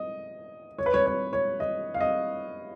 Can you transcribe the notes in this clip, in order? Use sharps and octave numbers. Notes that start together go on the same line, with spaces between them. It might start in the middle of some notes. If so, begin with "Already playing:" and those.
Already playing: D#5
C#5
B4
C#5
C#5
C#5
D#5
F5
D#5